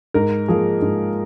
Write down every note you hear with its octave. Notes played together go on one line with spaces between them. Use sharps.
G#2 A#4
F3 A#3 G#4
G#2